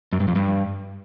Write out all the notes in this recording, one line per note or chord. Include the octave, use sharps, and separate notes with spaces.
F#2
G2
F2
G2